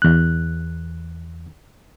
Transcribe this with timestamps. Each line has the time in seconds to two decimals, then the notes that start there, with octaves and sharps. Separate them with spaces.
0.02 E2 F#6